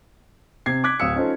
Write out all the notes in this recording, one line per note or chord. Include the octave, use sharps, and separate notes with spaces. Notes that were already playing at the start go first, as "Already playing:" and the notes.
C3 G#6 C7
D6 F#6 G#6 B6
D1 F5 D#6 E6 C#7
C#4 D#4 F4 A4 C5